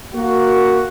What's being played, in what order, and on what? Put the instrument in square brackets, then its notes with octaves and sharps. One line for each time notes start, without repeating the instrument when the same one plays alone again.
[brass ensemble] A#3 F#4